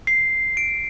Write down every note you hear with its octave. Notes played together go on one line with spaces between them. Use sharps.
C7
D7